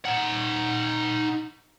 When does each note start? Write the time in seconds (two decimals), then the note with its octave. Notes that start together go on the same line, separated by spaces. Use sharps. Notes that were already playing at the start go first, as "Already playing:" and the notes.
0.05 D#4 F#5